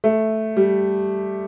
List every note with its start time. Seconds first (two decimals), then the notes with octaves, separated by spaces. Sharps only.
0.04 A3
0.57 G3